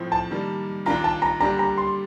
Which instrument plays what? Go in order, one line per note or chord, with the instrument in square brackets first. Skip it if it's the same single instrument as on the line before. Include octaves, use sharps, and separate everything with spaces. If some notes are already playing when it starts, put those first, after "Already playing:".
Already playing: [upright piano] A2 F3 C4
[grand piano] A5
[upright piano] D#3 G3 A#3
[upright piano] D#2 D#3 A#3 D4 F4 [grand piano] A#5
[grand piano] A5
A#5
[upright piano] D3 G3 A#3 D4 G4 [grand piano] A#5
[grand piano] A#5
C6